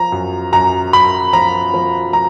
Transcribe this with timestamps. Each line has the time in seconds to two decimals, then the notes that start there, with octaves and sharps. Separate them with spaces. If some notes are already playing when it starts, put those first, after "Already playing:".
Already playing: F3 A#5
0.12 F#2
0.53 F#2 A#5
0.93 F#2 B5
1.33 F3 A#5
1.74 F3
2.13 F3 A#5